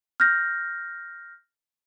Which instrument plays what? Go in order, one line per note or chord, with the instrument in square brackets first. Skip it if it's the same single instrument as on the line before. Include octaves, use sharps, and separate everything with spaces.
[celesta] F6 G6 A#6